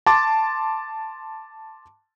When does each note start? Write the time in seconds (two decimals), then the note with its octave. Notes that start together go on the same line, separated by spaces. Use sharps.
0.06 A5 C6 D6 A6